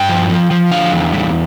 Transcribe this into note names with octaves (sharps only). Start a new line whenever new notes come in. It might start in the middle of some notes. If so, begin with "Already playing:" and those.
Already playing: G2 G5
F3
F3
F3
D3 F5
E2
G3